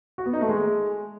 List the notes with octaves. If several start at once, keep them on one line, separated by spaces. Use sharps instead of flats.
F#4
B3
D#4
A3
G#3